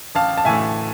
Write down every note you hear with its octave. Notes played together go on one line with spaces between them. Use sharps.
A1 F5 A5
A5
A2 E3 A3 E5 G#5